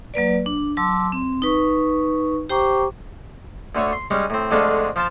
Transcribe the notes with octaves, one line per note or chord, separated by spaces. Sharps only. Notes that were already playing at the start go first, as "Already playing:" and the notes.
F#3 A#3 B4 D5
D4
F#3 A5 C6 D6 E6
C4
D#4 B4 C#6
G4 C5 G5 A#5 C#6 D6
D2 D3 A3 C#5 C#6
C6
G3 G#3 C#4
A2 C4
F2 D3 G#3 A3 D4 F4
F3 F4 A5